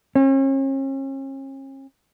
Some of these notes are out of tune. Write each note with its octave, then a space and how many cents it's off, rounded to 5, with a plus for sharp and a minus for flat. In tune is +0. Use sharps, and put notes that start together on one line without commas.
C#4 -40